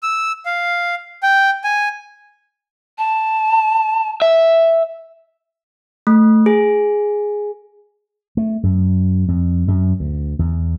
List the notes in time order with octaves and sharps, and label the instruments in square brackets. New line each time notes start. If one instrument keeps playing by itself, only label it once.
[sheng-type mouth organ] E6
F5
G5
G#5
[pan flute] A5
[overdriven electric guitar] E5
[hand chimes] A3
G#4
[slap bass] A3
F#2
F2
F#2
D2
E2